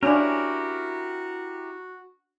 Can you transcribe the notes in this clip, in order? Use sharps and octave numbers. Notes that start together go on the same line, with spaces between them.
C#4 D4 E4 F#4 G4 A#4